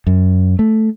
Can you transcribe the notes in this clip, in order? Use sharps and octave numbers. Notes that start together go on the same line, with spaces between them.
F#2
A3